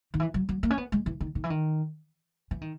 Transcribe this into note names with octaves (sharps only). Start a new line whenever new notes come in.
D#3
E3
F#3
F#3
A#3
C#4
B3
G#3
E3
D#3
D#3
E3
D#3
E3
D#3